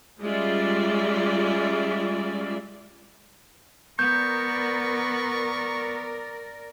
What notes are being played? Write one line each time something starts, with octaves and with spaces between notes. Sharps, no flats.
G3 G#3 C#4 F4 D5 E5
B3 A#4 D5 C#6 G6